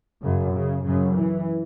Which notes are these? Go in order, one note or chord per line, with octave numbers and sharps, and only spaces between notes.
F#2 C#3
C#3
F#2 C#3
E3